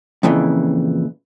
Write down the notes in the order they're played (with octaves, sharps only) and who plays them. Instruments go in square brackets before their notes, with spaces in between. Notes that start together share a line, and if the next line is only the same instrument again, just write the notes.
[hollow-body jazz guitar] F2 A#2 C#3 E3